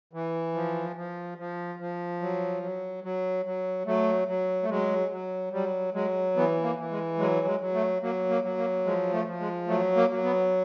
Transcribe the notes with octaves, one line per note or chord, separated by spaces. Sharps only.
E3
F3
F3
F3
F3
F#3
F#3
F#3
F#3
F#3 A3
F#3
A3
F#3 G#3
F#3
F#3 G3
F#3 G#3
E3 B3
A#3
E3
G#3
F#3 G#3
G#3
F#3
A3
F#3 A#3
A#3
F#3
A#3
F3 G#3
A3
F3
G#3
F#3 A3
A#3
F#3
B3